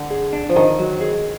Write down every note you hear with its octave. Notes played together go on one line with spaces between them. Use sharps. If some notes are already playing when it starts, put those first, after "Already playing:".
Already playing: D3
G#4
D4
F3
D#3 D#5
F#3
G#4